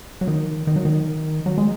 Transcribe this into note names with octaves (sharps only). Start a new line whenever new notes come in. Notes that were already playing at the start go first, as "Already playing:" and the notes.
F#3
D#3
D#3
F#3
D#3
F#3
G#3